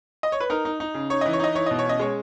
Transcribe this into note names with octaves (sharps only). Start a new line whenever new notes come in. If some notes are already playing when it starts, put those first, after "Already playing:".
D#5
C#5
B4
D#4 A#4
D#4
D#4
C#3
D#4 C#5
E3 D#5
C#5
D#4 D#5
E3 C#5
B2 D#5
C#5
C#4 D#5
G#3 C#5